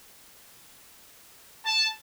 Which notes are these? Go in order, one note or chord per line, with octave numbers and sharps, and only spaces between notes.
A5